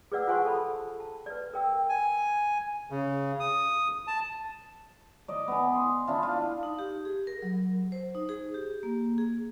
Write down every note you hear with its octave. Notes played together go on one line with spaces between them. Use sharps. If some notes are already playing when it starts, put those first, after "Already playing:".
G#4 B4 D5 F#5 E6
F4 C5 F#5 G#5 C6 C#6
A4 A5 B5
A5
B4 D5
A#4 G5 E6
G#5
C#3
D#6
A5
D5 D#5
B3 G#5
C6
D4 E4 F4
F4
D#4
G4
G#4
A#4
F#3
C5
D#4
G#4
G4
A#3
G#4